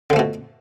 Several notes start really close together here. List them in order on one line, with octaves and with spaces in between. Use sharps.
D3 F3 A3 B2